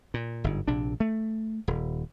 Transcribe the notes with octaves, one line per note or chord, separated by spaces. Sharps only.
A#2
G1 G#2
A#1 C3 D4
A3
D#1